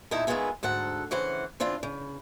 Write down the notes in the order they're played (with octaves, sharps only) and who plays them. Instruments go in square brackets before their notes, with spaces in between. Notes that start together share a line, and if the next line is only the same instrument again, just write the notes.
[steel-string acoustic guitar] E2 A#2 D#4 E4 A4 D#5
D#3 G#3 B3 E4 F4 G#4
D2 G#2 A4 F#5
C#3 E3 C5 F#5
E3 C4 D4 F4 F5
C#3